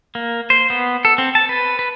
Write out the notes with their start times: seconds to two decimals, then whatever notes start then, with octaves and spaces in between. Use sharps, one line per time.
0.15 A#3
0.50 C5
0.70 B3
1.05 A4
1.18 C4
1.35 A5
1.49 B4
1.79 B4